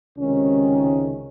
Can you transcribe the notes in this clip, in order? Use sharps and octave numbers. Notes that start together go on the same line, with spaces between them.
C#2 C3 D#3 C#4